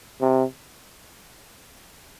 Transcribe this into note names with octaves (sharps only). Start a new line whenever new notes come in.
C3